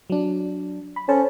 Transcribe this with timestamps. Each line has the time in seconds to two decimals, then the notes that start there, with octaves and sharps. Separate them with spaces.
0.10 F#3 D4
0.96 B5
1.09 C#4 A4 C5 A5